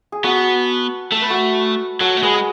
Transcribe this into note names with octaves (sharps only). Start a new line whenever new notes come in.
G#4
B3 F#4 A4
A3 A4
B4
F#4 A4
F#3 F#4 A4
A3
G#3 G#4 B4
G#4